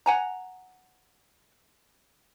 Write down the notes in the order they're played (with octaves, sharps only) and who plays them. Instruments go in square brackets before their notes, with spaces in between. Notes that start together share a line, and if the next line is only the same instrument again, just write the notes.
[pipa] F#5 G#5 A#5